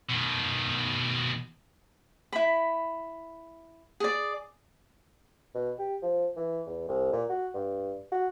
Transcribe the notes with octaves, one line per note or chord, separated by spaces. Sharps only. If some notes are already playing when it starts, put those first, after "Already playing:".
B2 D#3
E4 B5
G#4 D5
B2
G4
F3
E3
E2
C2
A#2
F#4
G2
F#4